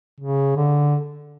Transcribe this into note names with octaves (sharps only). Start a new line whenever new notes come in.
C#3
D3